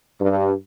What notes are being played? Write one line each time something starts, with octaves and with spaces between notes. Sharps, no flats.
G2